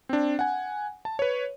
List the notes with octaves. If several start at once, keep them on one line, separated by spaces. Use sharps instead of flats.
C4 D4
F#5 G#5
A5
B4 C#5